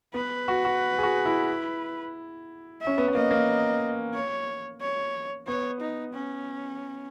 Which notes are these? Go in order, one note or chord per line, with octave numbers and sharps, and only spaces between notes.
B3 B4
F#4
F#4
G#4
F#4
E4
E5
C#4
B3
B3
A#3 D#5
A#3
C#5
C#5
B3 C#5
D#4
C#4